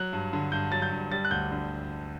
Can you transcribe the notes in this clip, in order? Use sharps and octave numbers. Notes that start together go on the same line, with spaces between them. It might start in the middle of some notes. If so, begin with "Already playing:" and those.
Already playing: F#3 F#6
G2
D3
G2 G6
F#3 A6
G6
G2
G3 A6
F#6
D2 G6
D3